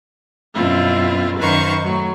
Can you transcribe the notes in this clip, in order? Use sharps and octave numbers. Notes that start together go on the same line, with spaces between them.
F#2 B2 C4 E4 F4
F#2 D#3 B4 C5 F5 C#6
A2 F#3